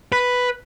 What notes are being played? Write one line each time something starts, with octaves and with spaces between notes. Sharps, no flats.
B4